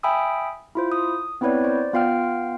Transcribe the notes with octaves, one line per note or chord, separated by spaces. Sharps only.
E5 G5 G#5 B5 D#6 E6
E4 F4 C5
D#6
B3 C4 E4 B4 C#5 D5
C5 D5
B3 F4 F5 G5 F6